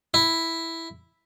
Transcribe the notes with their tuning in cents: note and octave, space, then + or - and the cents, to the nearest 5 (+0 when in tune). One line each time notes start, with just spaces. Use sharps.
E4 +0